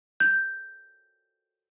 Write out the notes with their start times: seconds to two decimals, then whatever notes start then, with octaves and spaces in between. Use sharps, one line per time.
0.20 G6